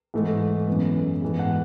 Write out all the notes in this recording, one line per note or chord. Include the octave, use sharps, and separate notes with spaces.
G#2 E3 A3
F#2 E3 B3
G#2 E3 B3
F#5